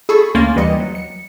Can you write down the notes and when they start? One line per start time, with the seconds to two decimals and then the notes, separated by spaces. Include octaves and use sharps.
0.09 G#4 A4 B5 C#6
0.34 D2 A#3 C#4 C6 A6
0.56 D#2 E3 G3 D#5 C#7
0.80 F#3
0.95 C#7